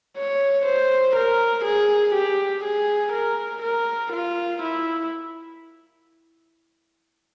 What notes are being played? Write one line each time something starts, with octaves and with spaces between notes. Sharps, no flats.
C#5
C5
A#4
G#4
G4
G#4
A#4
A#4
F4
E4